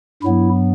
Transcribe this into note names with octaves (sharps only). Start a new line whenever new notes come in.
G2 F#3 B3 E4